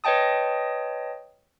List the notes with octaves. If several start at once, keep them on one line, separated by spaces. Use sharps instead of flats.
B4 C#5 D#5 G5 A5 D#6